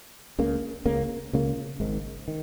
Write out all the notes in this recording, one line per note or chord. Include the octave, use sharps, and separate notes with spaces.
C#2 C#3 A#3
C#2 C#3 A#3
C#2 C#3 A#3
G#1 G#2 D#3
D#3